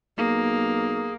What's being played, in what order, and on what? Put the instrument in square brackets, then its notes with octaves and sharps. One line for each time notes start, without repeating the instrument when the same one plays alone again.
[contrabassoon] B1 [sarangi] A#3 [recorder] G#4